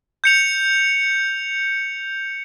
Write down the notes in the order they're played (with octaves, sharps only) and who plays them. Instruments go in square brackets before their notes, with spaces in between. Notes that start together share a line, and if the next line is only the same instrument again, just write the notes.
[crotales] G6 C#7 F7